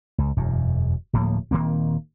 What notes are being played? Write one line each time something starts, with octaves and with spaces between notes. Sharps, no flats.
C#2
E1 F#2
D1 A2 F3 A#3
D#1 D#3 A#3 C4